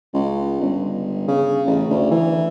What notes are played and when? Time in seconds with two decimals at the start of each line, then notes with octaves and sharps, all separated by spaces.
0.14 C#2
0.61 G1
1.28 C#3
1.67 A1
1.90 D2
2.11 E3